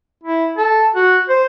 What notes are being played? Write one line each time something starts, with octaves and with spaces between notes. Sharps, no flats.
E4
A4
F#4
C5